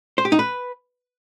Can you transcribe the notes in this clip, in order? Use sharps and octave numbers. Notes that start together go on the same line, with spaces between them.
C5
G4
D#4
B4